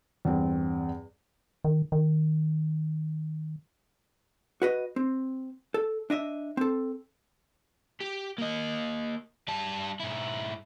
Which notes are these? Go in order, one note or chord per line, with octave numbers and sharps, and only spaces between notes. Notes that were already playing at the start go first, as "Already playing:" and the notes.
E2 G2 C4
D#3
D#3
F#4 B4 D#5
C4
A4
D4 D#5 E5
C4 A4
G4
A#3 D#5
G3 A5
G#2 E4